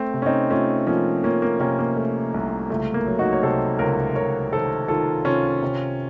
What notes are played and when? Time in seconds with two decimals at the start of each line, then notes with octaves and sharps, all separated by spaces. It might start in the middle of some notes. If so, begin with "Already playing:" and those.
Already playing: A3 C4
0.14 C3
0.22 C#4
0.26 C4 D#4
0.50 A3 C#4 F4
0.87 F3 A#3 C#4
1.24 F3 A#3 C#4
1.42 A#3
1.60 C3 A#3 C#4
1.78 A#3
1.97 A3
2.34 C2
2.70 C#2 A3
2.94 A#3
3.06 F#3
3.19 D#4 F#4
3.33 C#5
3.43 C3 A4 C5
3.79 C#2 A#4 C#5
4.15 C#2 A#4 C#5
4.52 D#3 A4 C5
4.88 D#3 F4 A4
5.25 C3 C#4 F4
5.62 C3